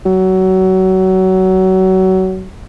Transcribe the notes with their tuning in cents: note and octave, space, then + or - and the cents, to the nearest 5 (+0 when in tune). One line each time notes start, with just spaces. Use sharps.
F#3 +25